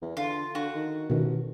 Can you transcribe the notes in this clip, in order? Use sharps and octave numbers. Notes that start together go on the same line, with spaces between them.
E2
D3 F4
D3 F#4
D#3
A1 B2 D#3